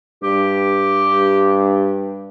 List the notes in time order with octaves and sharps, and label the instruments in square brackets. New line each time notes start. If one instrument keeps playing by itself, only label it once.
[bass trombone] G2 [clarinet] G4